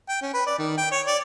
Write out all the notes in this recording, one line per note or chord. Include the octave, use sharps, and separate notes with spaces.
G5
C#4
B4
D5
D#3
G5
C#5
D5